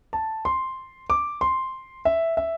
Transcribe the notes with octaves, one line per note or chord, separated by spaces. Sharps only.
A5
C6
D6
C6
E5
E5